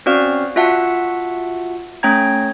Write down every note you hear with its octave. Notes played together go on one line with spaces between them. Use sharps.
C4 C#4 F#4 D5 F5 F6
F4 F#4 E5 F#5 A5
A3 C#4 C#5 G5 A#5 G#6